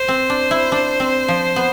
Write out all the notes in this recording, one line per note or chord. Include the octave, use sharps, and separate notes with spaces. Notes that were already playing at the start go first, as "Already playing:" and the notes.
Already playing: C5
C4
D4
E4
D4
C4
F3
B3